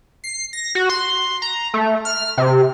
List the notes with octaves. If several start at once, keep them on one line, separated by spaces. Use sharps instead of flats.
C7
A#6
F#4
C6
A#5
A3
F6
C3